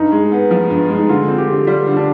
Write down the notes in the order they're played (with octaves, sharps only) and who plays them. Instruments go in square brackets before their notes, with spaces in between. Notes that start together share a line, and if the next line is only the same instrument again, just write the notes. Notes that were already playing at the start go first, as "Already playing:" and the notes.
Already playing: [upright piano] G2 [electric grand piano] D#4
[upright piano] G#3
B3
F3
G2
G#3
[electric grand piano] D#4
[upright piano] D3 [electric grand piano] F4
[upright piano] C4
[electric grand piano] G4
[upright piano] D3
[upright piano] G3 [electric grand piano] F4
[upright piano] D3
[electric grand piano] D4